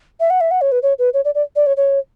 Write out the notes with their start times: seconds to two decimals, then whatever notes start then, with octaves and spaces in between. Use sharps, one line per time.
0.20 E5
0.30 F#5
0.41 E5
0.51 F#5
0.61 C#5
0.72 B4
0.82 C#5
0.98 B4
1.14 C#5
1.25 D5
1.35 D5
1.56 D5
1.66 C#5
1.77 C#5